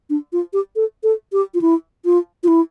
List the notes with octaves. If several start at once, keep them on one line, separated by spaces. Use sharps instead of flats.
D4
F4
G4
A4
A4
G4
F4
E4
F4
F4
E4